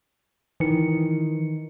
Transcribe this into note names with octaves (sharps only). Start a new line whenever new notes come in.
D#3 E3 C#7